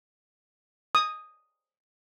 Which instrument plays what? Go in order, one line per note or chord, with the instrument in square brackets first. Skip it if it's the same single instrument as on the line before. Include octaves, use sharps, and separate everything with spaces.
[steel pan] D#6